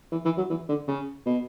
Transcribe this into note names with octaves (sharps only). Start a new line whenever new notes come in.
E3
E3
F#3
E3
D3
C#3
B2